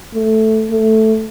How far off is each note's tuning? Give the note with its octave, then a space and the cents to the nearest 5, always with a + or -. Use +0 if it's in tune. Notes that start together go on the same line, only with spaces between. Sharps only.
A3 -5
A3 +0